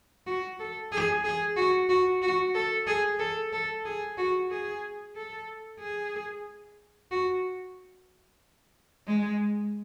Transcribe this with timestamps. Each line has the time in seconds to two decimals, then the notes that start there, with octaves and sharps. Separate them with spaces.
0.27 F#4
0.60 A4
0.92 G#4
1.24 G#4
1.57 F#4
1.89 F#4
2.22 F#4
2.55 A4
2.87 G#4
3.19 A4
3.53 A4
3.85 G#4
4.18 F#4
4.51 G#4
5.16 A4
5.81 G#4
7.11 F#4
9.07 G#3